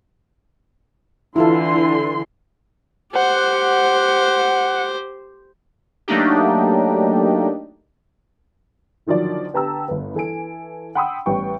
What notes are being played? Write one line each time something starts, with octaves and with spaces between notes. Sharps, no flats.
D3 E3 E4 F4 A4 C6
G4 C5 F#5
F#3 A3 A#3 D4 D#4 G4
D3 D#3 F3 F#3 D5
D3 B3 G4 A5 A#5 E6
G1 B3
E3 A4 G#5 D7
F#5 G5 B5 C6 D#6 E6
A1 G3 B3 B4 G5 C#6